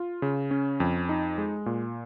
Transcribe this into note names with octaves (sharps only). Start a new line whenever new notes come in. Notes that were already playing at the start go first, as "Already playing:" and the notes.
Already playing: F4
C#3
C#4
F2
D#4
G#3
A#2